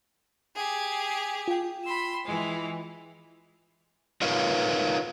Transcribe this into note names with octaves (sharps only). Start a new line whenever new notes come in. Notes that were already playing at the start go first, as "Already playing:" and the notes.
G4 G#4
F4 G5
B5 C6 E6
E3 G#3
D#4 F4 A#4 B4 C#5 F5